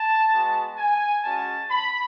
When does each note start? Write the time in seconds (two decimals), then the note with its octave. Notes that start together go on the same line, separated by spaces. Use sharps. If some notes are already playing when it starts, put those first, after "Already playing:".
Already playing: A5
0.31 G#3 B3 F#4
0.77 G#5
1.23 G#3 C#4 F#4 A5
1.69 B5